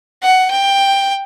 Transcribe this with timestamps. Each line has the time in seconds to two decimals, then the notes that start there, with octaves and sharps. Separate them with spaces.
0.22 F#5
0.51 G5